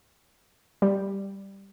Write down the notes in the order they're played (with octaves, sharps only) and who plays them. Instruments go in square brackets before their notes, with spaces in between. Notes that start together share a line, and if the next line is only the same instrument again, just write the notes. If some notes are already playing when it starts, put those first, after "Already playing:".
[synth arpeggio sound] G3